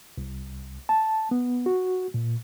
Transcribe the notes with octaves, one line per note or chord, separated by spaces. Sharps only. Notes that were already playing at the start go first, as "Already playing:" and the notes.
C2
A5
B3
F#4
A#2